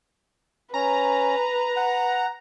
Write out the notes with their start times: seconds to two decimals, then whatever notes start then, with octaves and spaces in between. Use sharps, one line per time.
0.74 C#4 B4 A#5
1.76 F#5